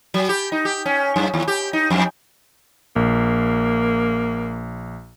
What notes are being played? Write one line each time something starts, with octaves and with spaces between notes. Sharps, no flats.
F#3
G4
D#4
G4
C#4
F#2
D#2
G4
D#4
F2
A#1 A#3